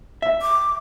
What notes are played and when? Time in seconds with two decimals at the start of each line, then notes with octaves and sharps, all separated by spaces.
0.22 E5
0.42 D6